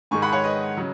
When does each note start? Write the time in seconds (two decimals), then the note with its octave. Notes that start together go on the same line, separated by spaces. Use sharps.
0.11 G#2 D#3 G#3 G#5 C#6
0.22 F#5 B5
0.32 C#5 F#5
0.44 B4 D#5
0.77 C#3 F#3